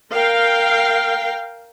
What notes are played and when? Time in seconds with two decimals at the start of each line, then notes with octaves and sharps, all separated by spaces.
0.12 A#4 F5 G5